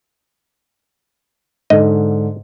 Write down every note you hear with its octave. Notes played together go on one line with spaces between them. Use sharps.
G#2 D3 D#5